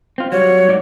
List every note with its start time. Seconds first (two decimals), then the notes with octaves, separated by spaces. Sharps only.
0.18 C4 F4
0.32 F#3 G3 C#5
0.69 G#2 F#3 D5